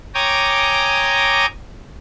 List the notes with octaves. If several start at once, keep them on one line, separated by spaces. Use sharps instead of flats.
C#5 G5 G#5 A#5 D6 D#6